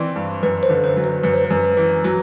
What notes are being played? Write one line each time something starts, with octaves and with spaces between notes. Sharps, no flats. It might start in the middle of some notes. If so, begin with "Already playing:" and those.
Already playing: E3 C4 D5
G2
F#2 B4
C5
D3
C5
F#3
B4
F#2 B4
C5
B4
F#2
E3
F#3